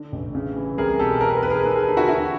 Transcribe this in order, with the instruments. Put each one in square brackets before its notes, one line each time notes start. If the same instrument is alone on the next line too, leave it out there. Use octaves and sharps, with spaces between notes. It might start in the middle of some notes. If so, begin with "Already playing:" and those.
Already playing: [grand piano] D3
A1
C#3
E3
C2 G#4 A#4
B2 G4 A4
E3 A#4
B4
A#4
D#2 B4
G#4 A#4
D#2 A4 B4
G#4 A#4
D3 G4 A4
E4 F#4
E3 E4 F#4